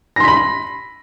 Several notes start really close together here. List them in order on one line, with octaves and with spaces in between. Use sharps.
A#6 C6 B6 B5